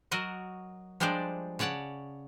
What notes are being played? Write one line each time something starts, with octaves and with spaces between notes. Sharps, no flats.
F#3 F#4 A#4 D#5 F#5
F3 G3 G#3 D4 C5 D5
C#3 C#5 D5 F#5 A5